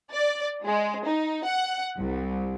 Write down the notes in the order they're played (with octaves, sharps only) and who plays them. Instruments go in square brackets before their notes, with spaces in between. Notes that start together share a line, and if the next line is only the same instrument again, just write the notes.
[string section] D5
G#3
D#4
F#5
C2